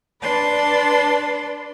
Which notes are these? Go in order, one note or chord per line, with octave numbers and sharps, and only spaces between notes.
D4 B4 D5 C6